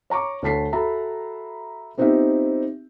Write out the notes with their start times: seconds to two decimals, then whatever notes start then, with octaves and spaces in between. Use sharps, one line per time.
0.10 C#5 A#5 C#6 D6
0.42 D2 C#5 A5 B6 C7
0.73 F#4 A4 E5 A#5 B5
1.98 B3 C4 D#4 F4 G4 E5